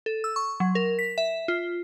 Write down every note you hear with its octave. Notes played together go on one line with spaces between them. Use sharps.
A4
E6
C#6
F#3
A#4
B6
E5
F4